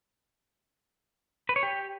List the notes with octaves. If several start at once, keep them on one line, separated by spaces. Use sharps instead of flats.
B4
C#5
G4